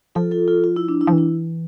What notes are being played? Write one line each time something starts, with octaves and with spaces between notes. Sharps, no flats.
F3 F4 A4
F4 A4
F4 A4
F4
E4
D4
E4
F3 D4
E3
E4